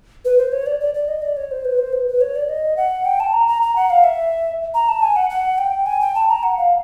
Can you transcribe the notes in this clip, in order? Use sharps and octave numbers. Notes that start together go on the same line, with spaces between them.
B4
C5
C#5
D5
D5
D5
D#5
D5
C#5
C5
B4
C5
B4
B4
C#5
D5
D#5
F#5
G5
A5
A#5
A#5
A#5
F#5
F5
E5
A#5
A5
G#5
F#5
F#5
G5
G#5
G5
A5
A#5
F#5
F5